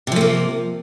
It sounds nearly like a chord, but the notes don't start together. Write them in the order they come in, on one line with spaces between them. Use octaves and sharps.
C3 F3 A3 A#3